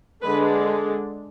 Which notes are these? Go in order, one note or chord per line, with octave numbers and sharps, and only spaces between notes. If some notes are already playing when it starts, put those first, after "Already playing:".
D3 G#3 D4 B4